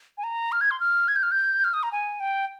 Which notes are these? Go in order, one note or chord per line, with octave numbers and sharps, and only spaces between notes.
G#5
A#5
F6
G#6
C6
F6
G#6
G6
F6
G6
F6
D#6
A#5
G#5
G5